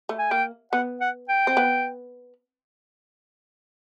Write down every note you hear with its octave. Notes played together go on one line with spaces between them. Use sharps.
A3
G#5
A#3 G5
B3 F#5
F#5
G5
C4
B3